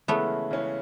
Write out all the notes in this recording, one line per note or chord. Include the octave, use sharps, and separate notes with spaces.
C#3 E3 G#3 A3 B3 C#4
C#3 E3 G#3 C#4